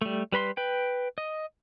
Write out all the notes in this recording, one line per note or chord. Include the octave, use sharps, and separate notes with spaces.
G3 A3
G3 B4 B5 C6
B4 G5
D#5